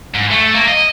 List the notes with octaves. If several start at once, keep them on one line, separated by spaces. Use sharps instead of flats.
G#2
A3
A#3
D#5